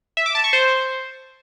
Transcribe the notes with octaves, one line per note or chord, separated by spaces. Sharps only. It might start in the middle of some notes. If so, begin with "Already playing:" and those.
E5
D6
A5
C#6
C5